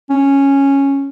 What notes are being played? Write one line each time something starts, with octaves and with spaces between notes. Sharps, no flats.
C#4